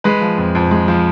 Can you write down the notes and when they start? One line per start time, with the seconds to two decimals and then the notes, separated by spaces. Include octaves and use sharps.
0.04 G#3 B4
0.21 F3
0.38 F2
0.55 F2
0.71 G#3
0.88 F3